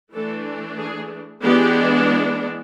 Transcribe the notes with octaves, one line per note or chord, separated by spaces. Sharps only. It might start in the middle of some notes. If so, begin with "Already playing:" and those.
E3 A3 D4 A4
G#4
E3 G#3 B3 D4 G4